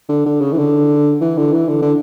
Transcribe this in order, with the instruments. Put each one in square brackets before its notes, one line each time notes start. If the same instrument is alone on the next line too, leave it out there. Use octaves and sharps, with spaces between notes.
[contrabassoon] D3
D3
C#3
E3
D3
E3
D3
E3
D3
D3